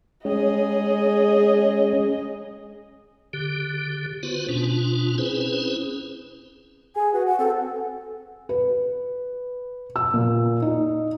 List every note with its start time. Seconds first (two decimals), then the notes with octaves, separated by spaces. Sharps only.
0.25 G#3 C#4 G#4 D#5
3.33 D3 G4
4.23 B3 F4 F#4 B4 C5
4.49 B2 C#4 D4 F4
5.18 C4 C#4 E4 G#4 B4 C5
6.96 G#4 G#5
7.13 F#4 B4
7.27 F#5
7.39 C4 A4
8.49 B4
9.96 E6
10.14 A#2
10.62 D#4